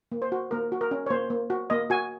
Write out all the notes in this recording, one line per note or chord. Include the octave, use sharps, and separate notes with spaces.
A#3
C5
F#4
A#3 A#4
F#4
A#4
C#4
C#5
A#3 C5
A#3
F#4
A#3 D#5
F#4 G#5